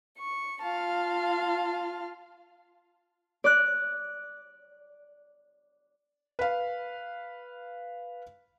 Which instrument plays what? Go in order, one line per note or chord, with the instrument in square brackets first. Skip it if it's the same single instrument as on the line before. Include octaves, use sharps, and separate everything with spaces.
[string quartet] C#6
F4 F5 A5
[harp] D5 F#6
[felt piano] B4 F5